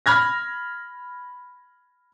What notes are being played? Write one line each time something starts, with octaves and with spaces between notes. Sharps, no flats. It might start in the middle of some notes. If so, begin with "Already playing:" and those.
B5 F6 G#6 A#6